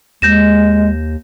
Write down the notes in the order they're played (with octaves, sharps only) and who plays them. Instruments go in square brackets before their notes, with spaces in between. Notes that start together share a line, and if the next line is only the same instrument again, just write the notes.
[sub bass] D#2 [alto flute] G#3 [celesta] G6 A#6 E7